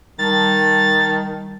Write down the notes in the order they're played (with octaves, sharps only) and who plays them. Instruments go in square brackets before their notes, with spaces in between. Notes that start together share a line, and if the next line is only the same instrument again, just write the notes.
[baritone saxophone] D#3 [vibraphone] G3 A5 [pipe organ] A6